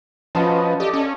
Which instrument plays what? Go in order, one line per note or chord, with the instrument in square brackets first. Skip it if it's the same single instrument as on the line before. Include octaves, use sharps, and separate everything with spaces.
[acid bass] F3 [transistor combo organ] C#4 B4 D#5 [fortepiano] F4 F#4 A5
[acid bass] G4 [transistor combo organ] A4 D5 D#5
[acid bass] C#4